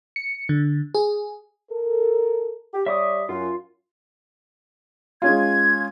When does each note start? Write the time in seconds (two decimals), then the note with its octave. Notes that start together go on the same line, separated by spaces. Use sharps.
0.16 C#7
0.49 D3
0.95 G#4
1.71 A4 A#4
2.74 G4
2.86 G3 C#5 E5 D6 D#6
3.29 F#2 F4
5.22 G#3 C#4 F4 G#6